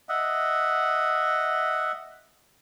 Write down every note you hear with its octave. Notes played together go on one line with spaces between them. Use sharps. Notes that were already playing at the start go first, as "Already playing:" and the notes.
D#5 E5 F#5